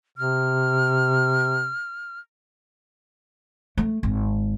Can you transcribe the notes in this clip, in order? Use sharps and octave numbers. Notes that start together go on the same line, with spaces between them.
C3 F6
A3
G#1